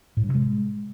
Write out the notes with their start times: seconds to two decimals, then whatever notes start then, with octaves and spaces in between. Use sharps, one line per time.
0.17 A2
0.23 G2
0.29 C3
0.35 G#3